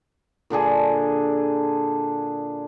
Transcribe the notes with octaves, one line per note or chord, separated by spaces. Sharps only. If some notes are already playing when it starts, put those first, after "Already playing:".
A#2 D3 D4 G#4